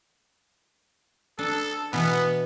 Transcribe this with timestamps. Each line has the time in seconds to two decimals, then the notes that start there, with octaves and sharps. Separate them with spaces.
1.39 D4 A4
1.93 B2 E3 B3